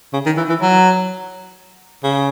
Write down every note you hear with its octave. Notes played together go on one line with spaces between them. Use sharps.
C#3
D#3
E3
E3
F#3
C#3